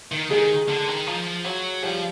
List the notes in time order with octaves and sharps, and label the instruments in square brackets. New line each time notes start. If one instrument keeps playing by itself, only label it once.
[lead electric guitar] D#3
[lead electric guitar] D#3 [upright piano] G#3 G#4
[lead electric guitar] D3
D#3
F3
F#3
[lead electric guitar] F3 [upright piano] G3 G4